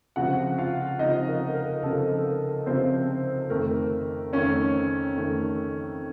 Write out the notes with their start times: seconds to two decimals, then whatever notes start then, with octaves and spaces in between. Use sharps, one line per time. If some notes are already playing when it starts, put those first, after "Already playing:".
0.16 C#2 C3 F3 F#4 F#5
0.58 F4 F5
0.99 C#2 C3 F3 D#4 D#5
1.28 A#4
1.55 A#4
1.83 C#2 C3 F3 A4
2.10 A#4
2.66 C#2 C3 F3 C4 C5
3.50 F2 D#3 A3 A#4
4.33 F2 D#3 A3 C#4 C#5
5.16 F2 D#3 A3